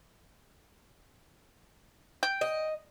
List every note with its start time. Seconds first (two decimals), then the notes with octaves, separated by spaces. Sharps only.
2.23 G5
2.41 D#5